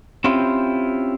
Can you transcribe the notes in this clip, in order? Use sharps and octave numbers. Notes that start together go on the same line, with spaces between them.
C4 C#4 E4 F4 G4 C5